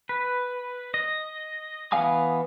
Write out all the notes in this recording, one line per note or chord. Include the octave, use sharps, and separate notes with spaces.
B4
D#5
E3 B3 F5 G#5 D#6